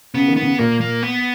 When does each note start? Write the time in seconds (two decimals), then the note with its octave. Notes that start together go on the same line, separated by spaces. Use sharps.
0.14 C#3 B3
0.28 D#3
0.37 B3
0.42 C#3
0.59 A#2 A#3
0.81 A#3
1.03 B3